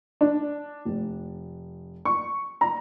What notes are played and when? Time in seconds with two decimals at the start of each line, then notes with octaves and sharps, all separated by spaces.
0.21 D4
0.85 F1
2.05 C#6
2.61 A#5